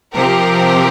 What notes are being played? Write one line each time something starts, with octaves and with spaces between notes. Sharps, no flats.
C3 F3 C4 G4 A#4